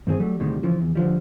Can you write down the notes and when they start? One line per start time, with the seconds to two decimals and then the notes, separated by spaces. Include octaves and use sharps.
0.07 G2 D#3 C4 G#4
0.20 F#3 G3 A3
0.40 D2 A2 C3 D#3 G3 G#3
0.63 C#3 E3 F3
0.80 E2
0.95 D3 F3 G3